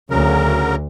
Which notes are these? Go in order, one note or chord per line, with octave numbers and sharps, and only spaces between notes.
D2 C#3 F#3 A#4